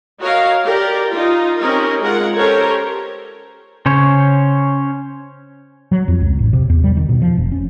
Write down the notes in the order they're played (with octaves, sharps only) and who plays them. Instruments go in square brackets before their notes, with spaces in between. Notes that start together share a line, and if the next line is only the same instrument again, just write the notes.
[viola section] F#4 A#4 C#5 D#5 F5
G4 A#4 D5
D#4 F4
C4 C#4 D#4 G4 A#4
G#3 F4 A#4 F#5
C#4 G4 A4 A#4 C5 C#5
[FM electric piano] C#3 [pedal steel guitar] C#4 C5 C#5
[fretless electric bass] F#3
F2
C#2
A1
C3
E2
G3
D#3
B2
F3
F1
C#4